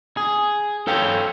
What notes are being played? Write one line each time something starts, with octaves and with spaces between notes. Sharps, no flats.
G#4
A4 C#5 F5 G5